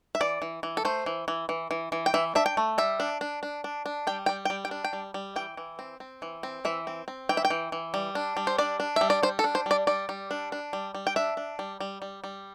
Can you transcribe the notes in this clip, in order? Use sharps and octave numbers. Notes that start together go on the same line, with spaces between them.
E5
E3 D5
E3
E3
A4
A3 C5
E3
E3
E3
E3
E3
G5
E3 E5
D4 E5
G5
A3
G3 E5
D4
D4
D4
D4
D4
G3 G5
G3 G5
G3 G5
G5
D4
G5
G3
G3
E3 G5
E3
C4
C4
E3
C4
E3 E5
C4
C4
E3 G5
E5
G5
E3
E3
G3
D4
G3
C5
D4 D5
D4
G3 E5
D5
G3 C5
A4
D4
C5
G3 D5
G3 D5
G3
D4
D4
G3
G3
G5
D4 E5
D4
G3
G3
G3
G3